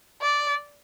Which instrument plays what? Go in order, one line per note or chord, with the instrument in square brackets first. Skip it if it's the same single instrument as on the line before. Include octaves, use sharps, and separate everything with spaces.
[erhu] D5